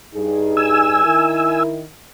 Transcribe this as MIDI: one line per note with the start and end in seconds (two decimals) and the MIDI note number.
0.14 1.01 43
0.14 1.01 63
0.14 1.01 68
0.57 1.63 80
0.57 1.63 88
1.04 1.84 51
1.04 1.84 64
1.04 1.84 70